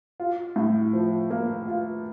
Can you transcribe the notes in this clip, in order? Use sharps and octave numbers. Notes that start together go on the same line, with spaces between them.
F4
A2
F3
A#3
F4